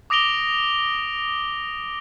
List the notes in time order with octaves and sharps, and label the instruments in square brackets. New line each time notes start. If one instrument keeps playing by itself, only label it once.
[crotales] D6 D#6 A#6 D7 F7 G7